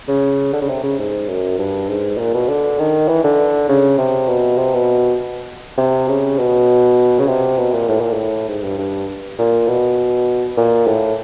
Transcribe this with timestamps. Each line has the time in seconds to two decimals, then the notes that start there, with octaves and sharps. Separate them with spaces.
0.08 C#3
0.53 D3
0.61 C#3
0.69 C3
0.83 C#3
0.98 G#2
1.28 F#2
1.59 G2
1.89 G#2
2.18 A#2
2.34 B2
2.49 D3
2.79 D#3
3.08 E3
3.24 D3
3.69 C#3
3.98 C3
4.28 B2
4.58 C3
4.74 B2
5.78 C3
6.08 C#3
6.38 B2
7.19 C#3
7.28 C3
7.58 B2
7.73 A#2
7.89 A2
8.01 A#2
8.13 A2
8.48 G#2
8.63 G2
8.78 G2
9.38 A#2
9.68 B2
10.57 A#2
10.87 A2